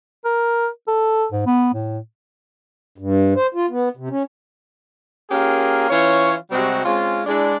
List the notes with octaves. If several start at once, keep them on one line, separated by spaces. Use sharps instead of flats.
A#4
A4
G#2
B3
A2
G2
C5
F4
B3
C3
C#4
A#3 C#4 F4 G4 G#4 A#4
E3 C#4 F4 C#5
C3 G3 G#3 C4 F#4
G#3 C4 C#4 F4
G#3 D4 E4